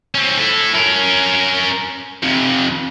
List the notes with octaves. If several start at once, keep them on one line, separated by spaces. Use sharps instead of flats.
C4 C#4
E4 A4
C#4 A#4
F2 C3